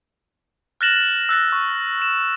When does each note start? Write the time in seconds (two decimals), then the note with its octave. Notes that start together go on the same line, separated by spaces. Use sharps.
0.81 F6 F#6 A6 A#6 E7 F#7
0.96 F#7
1.29 E6 F#6 A6 A#6
1.52 C#6
2.02 E7